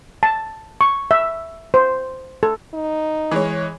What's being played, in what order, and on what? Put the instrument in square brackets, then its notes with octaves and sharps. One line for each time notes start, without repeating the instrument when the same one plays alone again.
[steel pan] A5
C#6
E5
C5
A4
[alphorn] D#4
[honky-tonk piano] E3 G#3 C#5